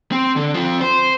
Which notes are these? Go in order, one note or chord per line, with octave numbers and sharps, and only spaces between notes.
C4
D3
F3 C4
C5